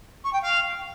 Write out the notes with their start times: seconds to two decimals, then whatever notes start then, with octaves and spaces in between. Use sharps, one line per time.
0.24 C#6
0.33 G5
0.42 F5